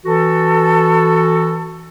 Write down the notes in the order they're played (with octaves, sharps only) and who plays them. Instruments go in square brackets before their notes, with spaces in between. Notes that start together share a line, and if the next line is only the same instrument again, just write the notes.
[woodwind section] E3 F#4 A4